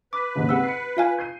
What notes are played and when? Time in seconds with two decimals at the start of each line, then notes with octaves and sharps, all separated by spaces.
0.13 B4 D6
0.35 D#2 G#2 C#3
0.49 C4 G4 G#4 F#5 E6
0.64 C7 C#7
0.97 F4 F5 G#5
1.18 G6 C7 D#7